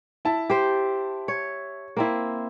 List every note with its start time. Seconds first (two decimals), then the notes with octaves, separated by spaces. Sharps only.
0.25 E4 A5
0.50 G4 C5
1.28 C#5
1.97 A#3 C4 E4